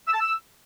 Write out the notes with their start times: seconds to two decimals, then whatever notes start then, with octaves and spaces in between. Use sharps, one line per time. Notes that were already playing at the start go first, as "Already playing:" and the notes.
0.07 E6
0.14 A5
0.20 E6